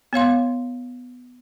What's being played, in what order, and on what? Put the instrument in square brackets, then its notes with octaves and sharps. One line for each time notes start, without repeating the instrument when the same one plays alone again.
[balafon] B3 C#5 F5 C6